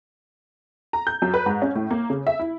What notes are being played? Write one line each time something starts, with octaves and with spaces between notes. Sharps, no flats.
A#5
G6
F#2
B4
G#2
C#4
A2
A#3
C#3
E5
E4